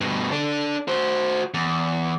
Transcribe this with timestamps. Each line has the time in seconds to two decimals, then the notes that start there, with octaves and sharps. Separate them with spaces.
0.01 G2 B2
0.32 D4 A4
0.88 F#4 C5
1.54 E2